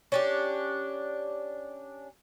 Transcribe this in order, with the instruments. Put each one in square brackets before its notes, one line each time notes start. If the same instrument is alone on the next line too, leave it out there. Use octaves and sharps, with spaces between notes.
[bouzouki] C#4 D4 G4